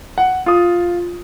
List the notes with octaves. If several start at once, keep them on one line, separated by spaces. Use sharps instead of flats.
F#5
F4 D#6